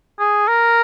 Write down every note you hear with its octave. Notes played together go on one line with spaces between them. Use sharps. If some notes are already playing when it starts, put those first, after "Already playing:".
G#4
A#4